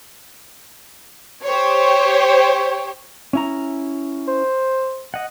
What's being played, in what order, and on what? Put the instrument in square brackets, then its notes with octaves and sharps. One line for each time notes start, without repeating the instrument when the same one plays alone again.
[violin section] G4 C5 C#5
[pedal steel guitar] C#4 E4 A#5
[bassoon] C5
[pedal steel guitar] D#5 F#5